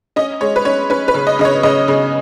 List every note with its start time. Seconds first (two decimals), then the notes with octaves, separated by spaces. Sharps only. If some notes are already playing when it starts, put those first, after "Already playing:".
0.16 C#4 D#5
0.41 G#3 C#5
0.56 B4
0.65 C#4 C#5
0.90 C#4 B4
1.08 B4
1.14 C#3
1.27 D#5
1.39 C#3 D#5
1.45 C#5
1.63 C#3 D#5
1.88 C#3